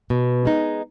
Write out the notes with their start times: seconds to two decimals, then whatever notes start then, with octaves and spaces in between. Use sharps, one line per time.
0.10 B2
0.45 G#3 D#4